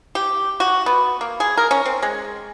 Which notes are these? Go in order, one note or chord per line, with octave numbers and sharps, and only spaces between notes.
G4
F#4
B3
A#3
G#4
A#4
C#4
C4
G#3